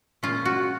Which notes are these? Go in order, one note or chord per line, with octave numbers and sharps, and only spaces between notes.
A#2 G#3 C#4 F4
F#4